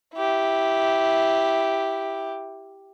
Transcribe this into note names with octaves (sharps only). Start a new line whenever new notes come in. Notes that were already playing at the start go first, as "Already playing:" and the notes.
E4 G4